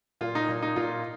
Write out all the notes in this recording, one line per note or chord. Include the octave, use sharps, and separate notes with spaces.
A#2 F4
D#4
A#2
D#4
A#2 F4